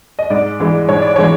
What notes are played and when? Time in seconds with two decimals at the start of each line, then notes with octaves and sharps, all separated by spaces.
0.19 D#5
0.30 G#2 D5
0.60 E3 G#3
0.89 G#2 C#5
1.02 D5
1.16 E3 G#3 C#5